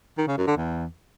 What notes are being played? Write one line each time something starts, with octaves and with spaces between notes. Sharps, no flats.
D#3
C#3
F#2
D3
E2